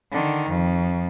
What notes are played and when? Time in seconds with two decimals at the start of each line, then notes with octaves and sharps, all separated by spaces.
0.12 D3 D#3
0.49 F2